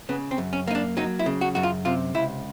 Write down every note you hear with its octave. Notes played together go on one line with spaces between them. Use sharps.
C#3 B3
C4
F#2
C#4
A#3 D#4
D4
F#3 D#4
E4
C#3
F#4
F#2 F#4
F4
C3 F4
C#2 E4